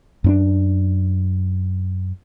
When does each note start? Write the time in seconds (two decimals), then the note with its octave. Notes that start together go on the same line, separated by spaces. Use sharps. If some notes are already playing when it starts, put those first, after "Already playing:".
0.24 F#2 C#4 D4